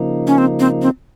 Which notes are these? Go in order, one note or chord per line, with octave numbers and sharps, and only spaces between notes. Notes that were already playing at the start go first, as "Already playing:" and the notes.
Already playing: C#3 F3 A#3 D#4
C#4
C4
C4
C4